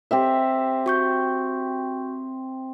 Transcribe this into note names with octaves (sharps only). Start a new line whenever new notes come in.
C4 G4 E5
F#4 C#6 G6